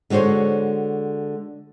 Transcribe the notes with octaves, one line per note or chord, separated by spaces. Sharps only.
D3 G#3 F#4 C5 C#5